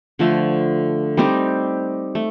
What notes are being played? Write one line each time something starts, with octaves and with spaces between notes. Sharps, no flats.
D3 F3 A3
G3 C4 D#4 G4
A3